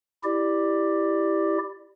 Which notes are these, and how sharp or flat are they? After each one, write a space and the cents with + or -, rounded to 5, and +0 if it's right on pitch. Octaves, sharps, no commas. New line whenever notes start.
E4 +0 G4 +0 D5 +15